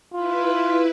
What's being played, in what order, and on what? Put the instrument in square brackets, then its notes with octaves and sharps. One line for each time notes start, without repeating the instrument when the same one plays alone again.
[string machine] E4 B4 [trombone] F4